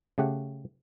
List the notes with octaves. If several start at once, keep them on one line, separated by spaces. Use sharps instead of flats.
C#3 A3 G4 F#5